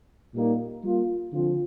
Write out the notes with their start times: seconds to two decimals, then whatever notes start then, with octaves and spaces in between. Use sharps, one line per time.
0.34 A#2 G3 A#3 D#4 A#4
0.84 G3 A#3 F4
1.33 D3 F3 C4 F4